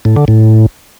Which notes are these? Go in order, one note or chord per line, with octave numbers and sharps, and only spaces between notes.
A2
D3
A2